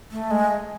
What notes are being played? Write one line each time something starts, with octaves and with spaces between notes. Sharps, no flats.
A3
G#3